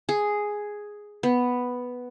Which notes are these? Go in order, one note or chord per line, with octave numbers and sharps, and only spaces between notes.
G#4
B3